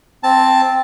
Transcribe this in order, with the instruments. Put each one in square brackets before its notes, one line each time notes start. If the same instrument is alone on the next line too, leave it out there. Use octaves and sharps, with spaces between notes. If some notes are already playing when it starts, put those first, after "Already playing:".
[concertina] C4 A5